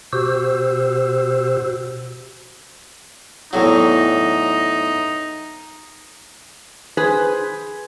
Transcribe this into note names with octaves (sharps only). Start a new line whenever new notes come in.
B2 F#4 G4 C5 E6
E2 A2 F#3 D#4
G#4 B4 C5